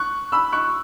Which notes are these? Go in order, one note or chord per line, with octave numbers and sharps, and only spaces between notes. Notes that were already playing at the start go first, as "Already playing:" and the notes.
Already playing: C#6 F#6
B5 E6
C#6 F#6